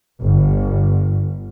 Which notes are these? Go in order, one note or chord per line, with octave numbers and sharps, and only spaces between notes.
G1